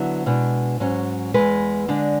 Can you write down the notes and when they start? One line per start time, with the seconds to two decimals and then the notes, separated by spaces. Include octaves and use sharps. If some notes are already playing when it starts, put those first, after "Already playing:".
Already playing: D3 F#3 B3 E4
0.26 B2 G#3 D4
0.80 G#2 F#3 C#4
1.34 B2 G#3 B4
1.38 E2
1.88 D3 G#3 D4